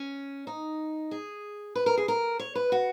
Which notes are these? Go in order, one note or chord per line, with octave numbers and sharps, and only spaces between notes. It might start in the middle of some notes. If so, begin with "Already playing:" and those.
Already playing: C#4
D#4
G#4
B4
A#4
G#4
A#4
C#5
B4
F#4